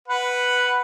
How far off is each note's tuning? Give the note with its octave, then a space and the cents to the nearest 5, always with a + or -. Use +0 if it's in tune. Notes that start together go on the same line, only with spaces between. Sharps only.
B4 +0 F#5 +0